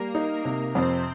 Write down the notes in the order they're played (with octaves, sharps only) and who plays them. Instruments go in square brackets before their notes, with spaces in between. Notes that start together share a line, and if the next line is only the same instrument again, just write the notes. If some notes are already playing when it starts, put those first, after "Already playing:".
Already playing: [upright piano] G3 [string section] A#3 A#4
[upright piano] D#4
C3
[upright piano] F2 [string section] C4 C5